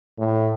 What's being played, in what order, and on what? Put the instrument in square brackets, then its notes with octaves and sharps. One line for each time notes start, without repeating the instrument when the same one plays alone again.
[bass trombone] A2